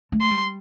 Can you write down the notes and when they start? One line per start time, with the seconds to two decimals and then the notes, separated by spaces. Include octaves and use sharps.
0.12 A3
0.21 C6
0.30 G3